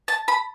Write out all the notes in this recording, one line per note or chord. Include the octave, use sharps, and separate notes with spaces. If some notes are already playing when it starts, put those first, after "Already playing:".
A5
B5